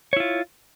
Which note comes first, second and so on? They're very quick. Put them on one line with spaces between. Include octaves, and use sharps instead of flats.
C#5 E4 F4